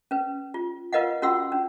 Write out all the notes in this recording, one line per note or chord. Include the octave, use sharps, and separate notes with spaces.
C#4 B4
F4
F4 A#4 B4 D#5 F5 F#5
C#4 F4 F#4 F#5 C6 E6
C#4 D4